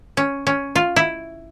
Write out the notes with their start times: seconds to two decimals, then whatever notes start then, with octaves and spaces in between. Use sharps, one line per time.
0.17 C#4
0.47 C#4
0.75 F4
0.96 E4